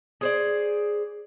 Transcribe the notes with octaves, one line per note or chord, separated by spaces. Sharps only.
G#4 C5 D5